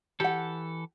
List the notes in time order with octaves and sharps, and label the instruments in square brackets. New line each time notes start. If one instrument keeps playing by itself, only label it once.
[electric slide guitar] E3 A4 [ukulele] G4 F#5